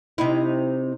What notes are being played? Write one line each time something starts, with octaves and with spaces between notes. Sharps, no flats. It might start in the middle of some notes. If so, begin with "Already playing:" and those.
C3 D#4 E4